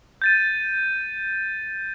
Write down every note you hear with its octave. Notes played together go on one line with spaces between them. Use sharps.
G6 A6 D#7